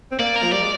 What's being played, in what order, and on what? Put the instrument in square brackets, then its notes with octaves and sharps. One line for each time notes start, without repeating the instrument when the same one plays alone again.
[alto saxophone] C4
[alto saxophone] A#3 [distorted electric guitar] D5
[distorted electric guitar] A#4
[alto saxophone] F3
[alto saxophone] G3 [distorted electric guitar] D5
[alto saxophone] G#3